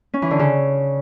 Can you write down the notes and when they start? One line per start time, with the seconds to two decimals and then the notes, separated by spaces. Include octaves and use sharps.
0.14 C#4
0.22 E3
0.31 D3
0.39 C#3